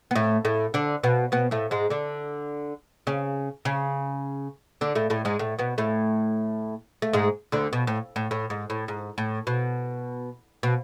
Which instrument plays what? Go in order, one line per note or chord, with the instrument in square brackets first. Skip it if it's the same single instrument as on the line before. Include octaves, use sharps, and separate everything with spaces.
[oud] B3
A2 A3
A2 A3
D3 D4
B2 B3
B2 B3
A2 A3
G#2 G#3
D3 D4
C#3 C#4
C#3 C#4
D3 D4
A2 A3
A2 A3
G#2 G#3
A2 A3
B2 B3
A2 A3
A3
G#2 G#3
D2 D3
B2
A2
A2
A2
G#2
A2
G#2
A2
B2
B2